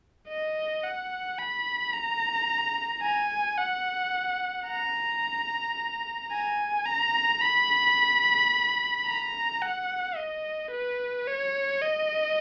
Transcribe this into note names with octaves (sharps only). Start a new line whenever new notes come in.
D#5
F#5
B5
A#5
G#5
F#5
A#5
G#5
A#5
B5
A#5
F#5
D#5
B4
C#5
D#5